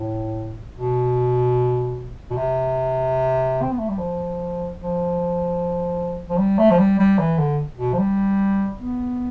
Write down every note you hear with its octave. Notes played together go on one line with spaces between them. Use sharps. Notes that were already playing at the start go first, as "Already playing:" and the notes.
Already playing: A2
B2
B2
C3
C4
B3
A3
G3
F3
F3
F3
G3
A3
F3
G3
G3
E3
D3
B2
F3
G3
B3